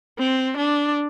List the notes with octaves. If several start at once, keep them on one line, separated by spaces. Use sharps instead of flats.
C4
D4